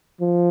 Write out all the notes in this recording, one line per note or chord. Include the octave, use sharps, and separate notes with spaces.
F3